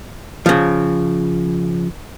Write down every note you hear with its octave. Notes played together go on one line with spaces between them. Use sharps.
C#3 F3